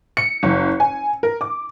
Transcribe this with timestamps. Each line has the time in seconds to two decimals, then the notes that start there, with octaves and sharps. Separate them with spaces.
0.17 C#7
0.43 F#1
0.80 G#5
1.23 A#4
1.41 D6